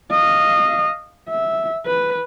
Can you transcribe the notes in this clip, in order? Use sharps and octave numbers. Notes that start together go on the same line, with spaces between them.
D#5 F5
E5
B4